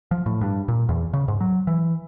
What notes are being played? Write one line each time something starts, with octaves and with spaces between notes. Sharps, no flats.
F3
A2
G2
A#2
E2
C#3
G#2
F#3
E3